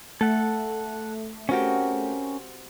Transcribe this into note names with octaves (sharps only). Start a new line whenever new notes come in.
A3 A4 F#5
C4 C#4 F#4 G4 A#4